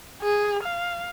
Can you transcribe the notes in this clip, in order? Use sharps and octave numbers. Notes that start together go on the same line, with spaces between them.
G#4
F5